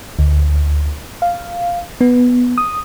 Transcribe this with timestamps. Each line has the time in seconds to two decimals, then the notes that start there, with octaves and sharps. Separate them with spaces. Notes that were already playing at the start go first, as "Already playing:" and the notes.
0.19 D2
1.22 F5
2.01 B3
2.58 D#6